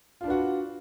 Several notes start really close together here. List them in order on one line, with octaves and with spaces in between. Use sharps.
F4 D4 B4 F#4